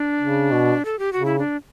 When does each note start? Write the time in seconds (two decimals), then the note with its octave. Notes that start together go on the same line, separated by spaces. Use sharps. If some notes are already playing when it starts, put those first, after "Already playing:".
Already playing: D4
0.22 C#3
0.51 B2
0.85 A4
0.99 G4
1.13 C#3 F#4
1.25 E4
1.39 D4